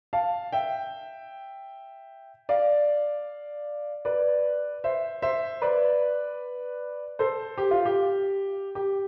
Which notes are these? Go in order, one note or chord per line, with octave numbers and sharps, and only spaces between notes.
F5 A5
E5 G5
D5 F5
B4 D5
C5 E5
C5 E5
B4 D5
A4 C5
G4
F4
G4
G4